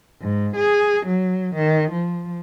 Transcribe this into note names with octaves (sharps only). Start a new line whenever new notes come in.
G#2
G#4
F#3
D#3
F3